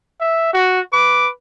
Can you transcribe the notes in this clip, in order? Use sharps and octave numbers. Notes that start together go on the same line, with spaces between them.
E5
F#4
B4 D6